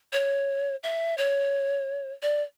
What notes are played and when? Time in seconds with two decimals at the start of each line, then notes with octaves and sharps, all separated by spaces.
0.13 C#5
0.83 E5
1.18 C#5
2.22 D5